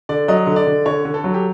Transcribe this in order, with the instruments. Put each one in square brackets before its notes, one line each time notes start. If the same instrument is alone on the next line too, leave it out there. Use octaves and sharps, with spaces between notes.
[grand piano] D3 [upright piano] D5
[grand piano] F#3 [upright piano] D#5
[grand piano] D3
[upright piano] D5
[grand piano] D3
[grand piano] D3 [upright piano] C#5
[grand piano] D3
[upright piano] A4
[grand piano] F#3
[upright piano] G4